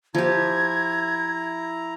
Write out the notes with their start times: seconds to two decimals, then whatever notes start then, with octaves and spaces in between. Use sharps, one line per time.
0.15 F3 E4 G4 A#5 G#6